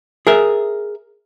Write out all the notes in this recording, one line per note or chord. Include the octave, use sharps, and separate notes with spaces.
G#4 A#4 E5